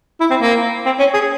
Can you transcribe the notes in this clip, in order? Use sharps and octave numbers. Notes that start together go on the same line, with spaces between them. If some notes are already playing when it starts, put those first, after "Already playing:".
E4
C4
A#3
C4
C#4
G#4